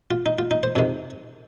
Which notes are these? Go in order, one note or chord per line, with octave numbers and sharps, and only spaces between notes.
F4
D#4
F4
D#4
C5
F2 C3 D#3 G#3